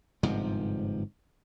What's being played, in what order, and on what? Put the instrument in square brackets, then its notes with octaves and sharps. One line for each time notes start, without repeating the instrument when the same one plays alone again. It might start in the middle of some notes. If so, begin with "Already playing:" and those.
[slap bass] G1 G#2 C3 F3